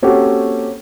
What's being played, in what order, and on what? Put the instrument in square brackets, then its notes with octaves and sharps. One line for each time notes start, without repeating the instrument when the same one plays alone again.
[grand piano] A#3 C4 C#4 F#4 G4 A4